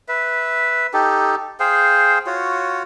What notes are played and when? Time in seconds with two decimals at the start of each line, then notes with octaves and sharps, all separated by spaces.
0.08 B4 E5
0.94 D#4 G4 A4
1.60 G#4 C5 F5 G5
2.27 F4 F#4 C#5